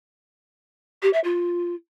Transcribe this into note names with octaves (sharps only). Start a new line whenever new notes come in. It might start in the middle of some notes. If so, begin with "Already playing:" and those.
G4
E5
F4